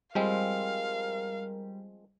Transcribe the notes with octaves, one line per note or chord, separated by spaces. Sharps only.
F3 G3 G#3 C4 A#4 F5